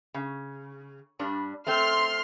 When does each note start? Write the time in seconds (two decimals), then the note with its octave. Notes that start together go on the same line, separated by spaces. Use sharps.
0.14 C#3
1.19 G2 G3 D4
1.67 A3 C4 C6 F6